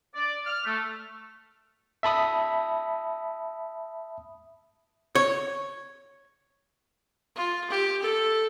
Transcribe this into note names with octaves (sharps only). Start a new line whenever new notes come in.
D5
F6
A3
E5 A5 B5 D#6
C#5
F4
G4
A4